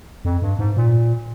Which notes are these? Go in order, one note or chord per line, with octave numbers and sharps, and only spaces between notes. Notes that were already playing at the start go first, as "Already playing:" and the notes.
F2
G2
G#2
A#2